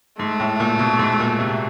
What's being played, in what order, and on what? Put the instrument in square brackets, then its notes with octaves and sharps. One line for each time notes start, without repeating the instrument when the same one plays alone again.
[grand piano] G#2 [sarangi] A3
[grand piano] A2
A#2
B2
G#2
A#2
C3